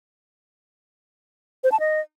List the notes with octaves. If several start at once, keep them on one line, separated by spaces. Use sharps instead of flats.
C5
A5
D#5